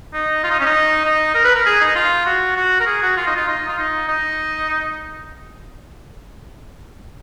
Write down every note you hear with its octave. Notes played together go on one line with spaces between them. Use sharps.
D#4
F4
D#4
C#4
D#4
D#4
A#4
B4
A#4
G#4
D#4
F4
F#4
F#4
A#4
G#4
F#4
F4
D#4
F4
D#4
F4
D#4
D#4